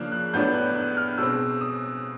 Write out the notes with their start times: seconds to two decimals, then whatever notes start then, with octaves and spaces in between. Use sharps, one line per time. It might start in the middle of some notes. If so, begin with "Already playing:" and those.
Already playing: C#3 F3 A#3 D4 F#6
0.12 F#6
0.34 A2 F#3 B3 D4 G6
0.54 F#6
0.76 F#6
0.97 F6
1.18 B2 G#3 C4 E6
1.61 D#6